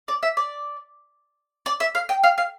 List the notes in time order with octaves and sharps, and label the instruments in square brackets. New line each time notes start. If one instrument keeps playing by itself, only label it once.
[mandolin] D5
E5
D5
D5
E5
F5
G5
F5
F5